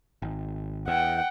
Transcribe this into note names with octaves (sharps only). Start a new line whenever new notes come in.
G#1
E2 F#5 G5